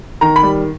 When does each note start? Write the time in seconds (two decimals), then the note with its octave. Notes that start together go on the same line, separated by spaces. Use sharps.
0.21 D#3 A#5
0.36 B5
0.43 G3